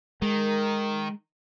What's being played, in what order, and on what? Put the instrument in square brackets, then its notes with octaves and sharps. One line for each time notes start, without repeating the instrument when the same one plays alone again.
[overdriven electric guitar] D#3 [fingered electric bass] G#3 [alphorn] A#4